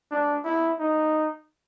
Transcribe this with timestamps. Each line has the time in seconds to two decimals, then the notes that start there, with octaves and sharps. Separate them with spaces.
0.11 D4
0.44 E4
0.79 D#4